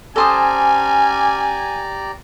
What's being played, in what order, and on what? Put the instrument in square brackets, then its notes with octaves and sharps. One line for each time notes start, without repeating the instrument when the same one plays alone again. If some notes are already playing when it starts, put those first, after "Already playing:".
[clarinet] C#4 [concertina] G4 D5 A#5 [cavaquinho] A4 C5 D#6 [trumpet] G#5